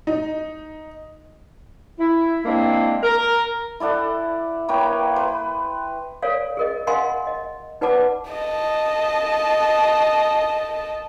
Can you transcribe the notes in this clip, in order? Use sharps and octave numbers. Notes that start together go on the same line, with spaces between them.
D#4
E4
G#3 A#3 C4 D4 E4
A#4
E4 A4 D5 F#5
A#3 B4 C#5 G5
B4 C6
A4 A#4 C#5 D5 F5
G#4 A#4 D#5
A#4 D#5 F5 F#5 G#5 C6
D#5
D#4 B4 D5 F#5 A5 D6
D#5 A5